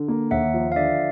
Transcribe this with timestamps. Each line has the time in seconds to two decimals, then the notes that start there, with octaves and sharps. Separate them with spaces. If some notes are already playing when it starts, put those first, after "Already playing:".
Already playing: D3
0.08 A#3
0.31 D#2 E5 F#5
0.54 F3
0.72 F5
0.76 D3 D5 E5